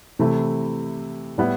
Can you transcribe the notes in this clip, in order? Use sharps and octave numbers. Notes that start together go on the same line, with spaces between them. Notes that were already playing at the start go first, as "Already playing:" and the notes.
C3 E3 A3 E4
A2 G3 B3 E4